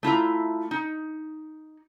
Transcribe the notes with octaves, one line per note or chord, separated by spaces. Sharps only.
A3 E4 F4 A#5
D#4